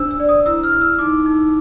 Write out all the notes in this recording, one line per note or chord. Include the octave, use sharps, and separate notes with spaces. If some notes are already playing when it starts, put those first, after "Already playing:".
Already playing: D4 C5 E6
E6
D5
D#6
E4 E6
F6
E4
E6
D#4 D6
D#4